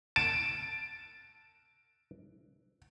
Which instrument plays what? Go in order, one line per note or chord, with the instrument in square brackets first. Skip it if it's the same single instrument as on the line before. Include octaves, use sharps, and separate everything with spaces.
[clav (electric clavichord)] A5 [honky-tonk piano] D7